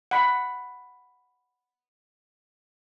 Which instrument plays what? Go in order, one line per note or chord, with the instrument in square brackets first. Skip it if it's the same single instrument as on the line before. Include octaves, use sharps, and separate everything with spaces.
[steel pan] F#5 B5